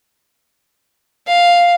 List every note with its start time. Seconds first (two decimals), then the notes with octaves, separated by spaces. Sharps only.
1.27 F5